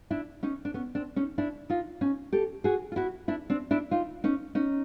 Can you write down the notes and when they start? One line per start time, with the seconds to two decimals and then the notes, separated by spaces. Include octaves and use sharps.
0.11 D4 E4
0.43 C#4 D#4
0.65 D4
0.74 B3 C#4
0.95 C4 D4
1.16 C#4 D#4
1.38 D4 E4
1.70 D#4 F4
2.01 C#4 D#4
2.33 G4 A4
2.64 F#4 G#4
2.92 F4
2.96 E4 F#4
3.28 D4 E4
3.50 C4 D4
3.71 D4 E4
3.91 D#4 F4
4.24 C#4 D#4
4.55 C#4 D#4